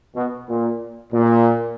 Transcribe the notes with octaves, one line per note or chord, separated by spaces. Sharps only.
B2
A#2
A#2